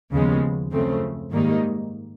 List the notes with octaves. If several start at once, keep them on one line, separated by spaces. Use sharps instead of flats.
D#2 C#3 F3 G#3 B3
F#2 C#3 F3 A3 C4
G#2 D#3 G3 A#3 D#4